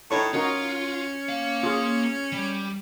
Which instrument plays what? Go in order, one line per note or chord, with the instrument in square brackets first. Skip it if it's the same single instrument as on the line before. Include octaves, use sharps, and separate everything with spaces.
[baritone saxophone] A2 [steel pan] D#4 C#5 C#6
[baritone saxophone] C#4 [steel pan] D#4 F#4 A#4 [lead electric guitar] F4
[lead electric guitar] A#3 F5
[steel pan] F4 G#4
[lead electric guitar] G3